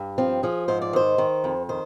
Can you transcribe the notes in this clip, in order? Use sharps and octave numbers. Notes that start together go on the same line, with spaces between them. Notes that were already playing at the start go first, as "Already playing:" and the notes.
Already playing: G2
F3 C4
F3 G#4
G#2 C5
D5
D#3 C5
D#3
F2
D#3 C5